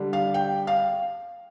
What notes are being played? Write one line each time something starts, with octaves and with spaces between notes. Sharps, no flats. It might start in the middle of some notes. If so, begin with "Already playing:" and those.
Already playing: D3 G3
F5
G5
F5